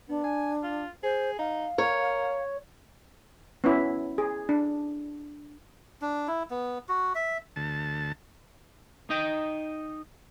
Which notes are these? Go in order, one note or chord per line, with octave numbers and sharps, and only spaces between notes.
B3 D4
G#5
F4
G#4 C5
D#4 F5
A#4 C#5
B3 C#4 E4
G#4
D4
D4
E4
B3
F#4
E5
D2 A5
D#4 D#5 G5